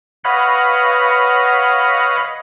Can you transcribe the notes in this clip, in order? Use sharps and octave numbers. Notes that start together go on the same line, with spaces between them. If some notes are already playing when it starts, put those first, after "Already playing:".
B4 C#5 D#5 F5 F#5 B5